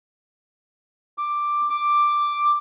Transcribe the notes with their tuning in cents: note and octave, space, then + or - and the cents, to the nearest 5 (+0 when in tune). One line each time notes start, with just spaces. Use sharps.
D6 +5
D6 +5